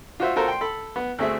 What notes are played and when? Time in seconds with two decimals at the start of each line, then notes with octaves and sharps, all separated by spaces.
0.20 F4 F#4 C5 E5
0.36 F4 F#4 A4 A#4 C5
0.48 G5 C6
0.61 A4 B5
0.96 B3
1.19 D2 A3 C4 G#4 E5